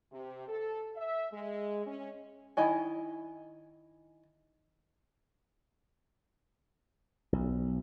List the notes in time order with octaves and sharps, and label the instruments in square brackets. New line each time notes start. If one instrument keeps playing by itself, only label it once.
[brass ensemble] C3
A4
E5
G#3
C#4
[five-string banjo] D#3 E4 D#5 G#5
[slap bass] B1